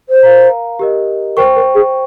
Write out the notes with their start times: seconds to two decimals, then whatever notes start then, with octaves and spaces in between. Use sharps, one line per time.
0.09 C5
0.23 A#4 F5 A#5
0.79 G4 A#4 D#5
1.36 A#4 C5 G5 C#6
1.56 A#4
1.74 G#4